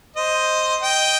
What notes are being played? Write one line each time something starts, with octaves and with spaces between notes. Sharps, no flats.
C5 D#5
D#5 G5